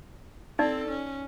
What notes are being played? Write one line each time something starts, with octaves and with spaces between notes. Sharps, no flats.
C4 D#4 A4 D5
C#4